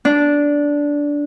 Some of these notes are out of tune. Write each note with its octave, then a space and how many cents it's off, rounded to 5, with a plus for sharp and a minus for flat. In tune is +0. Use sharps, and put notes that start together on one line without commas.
D4 -10